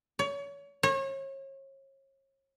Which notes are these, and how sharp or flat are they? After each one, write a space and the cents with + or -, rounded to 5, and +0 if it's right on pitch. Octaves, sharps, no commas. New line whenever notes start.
C#5 +30
C#5 -35